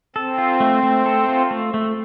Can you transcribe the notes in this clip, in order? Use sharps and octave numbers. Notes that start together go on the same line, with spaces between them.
C4 A4
F4
A3
A3
A4
F4
A3
A3